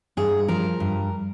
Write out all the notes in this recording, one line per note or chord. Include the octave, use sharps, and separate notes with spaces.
G2 G#4
F3 A#4
G2